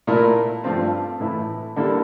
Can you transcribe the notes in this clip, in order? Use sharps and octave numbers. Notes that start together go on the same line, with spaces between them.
A#2 A3 E4 A#4
G2 F3 A3 C4 F4
A2 E3 A3 E4
D3 G3 A#3 E4 A4